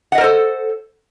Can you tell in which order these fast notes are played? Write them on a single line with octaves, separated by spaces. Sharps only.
F#5 D#5 A#4 C5 A4